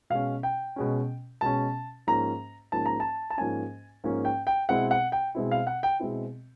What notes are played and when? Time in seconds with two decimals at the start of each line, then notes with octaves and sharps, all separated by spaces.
0.10 B2 G#3 C#4 F5
0.43 G5
0.76 B2 G#3 C#4
1.41 B2 G#3 C#4 A5
2.07 G#2 F3 A#3 C#4 A#5
2.72 G#2 F3 A#3 C#4 A5
2.86 A#5
3.00 A5
3.30 A5
3.38 G#2 F3 A#3 C#4 G#5
4.04 G#2 F3 A#3 C#4
4.25 G5
4.47 G5
4.69 B2 G#3 C4 E4 F#5
4.91 F#5
5.12 G5
5.35 B2 G#3 C4 E4
5.51 F5
5.67 F#5
5.83 G5
5.99 B2 G#3 C4 E4